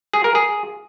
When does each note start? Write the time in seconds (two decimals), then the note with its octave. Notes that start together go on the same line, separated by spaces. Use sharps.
0.13 G#4
0.24 A#4
0.35 G#4